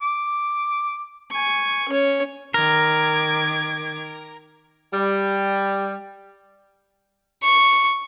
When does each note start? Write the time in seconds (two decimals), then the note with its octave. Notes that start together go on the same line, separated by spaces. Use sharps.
0.02 D6
1.32 G#5 C#6
1.89 C#4 C#5
2.54 D#3 A#4 D6 G#6
4.93 G3
7.43 C#6